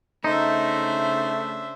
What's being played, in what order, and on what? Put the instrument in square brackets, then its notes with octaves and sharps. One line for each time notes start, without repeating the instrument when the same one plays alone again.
[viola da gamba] C#3 C5 [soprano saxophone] A3 [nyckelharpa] D4 E5 [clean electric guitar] D#4